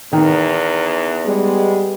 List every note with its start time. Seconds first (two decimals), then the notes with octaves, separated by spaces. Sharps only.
0.13 E2 D#3
1.25 G3 G#3 B3